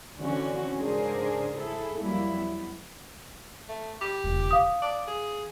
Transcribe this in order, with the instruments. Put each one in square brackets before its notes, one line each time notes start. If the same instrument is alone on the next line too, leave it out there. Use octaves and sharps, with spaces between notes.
[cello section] D3 E3 C4 C#4 F#4
G#2 C#3 D4 G#4 A#4 C5
E4 G#4 A4
F2 F#3 G3 A#3 E4
B3
[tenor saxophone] A3
G4
[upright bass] E1 C#2
[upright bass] E3 [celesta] F5 D#6
[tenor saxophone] D5
G#4